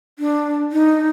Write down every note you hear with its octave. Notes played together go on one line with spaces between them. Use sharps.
D4
D#4